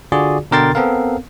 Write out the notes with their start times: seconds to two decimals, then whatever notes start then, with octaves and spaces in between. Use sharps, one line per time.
0.12 D3 F4 F#4 G#4 D5
0.51 B2 D3 A#4 G5 C6 A6
0.75 B3 C4 A4 A#4 F5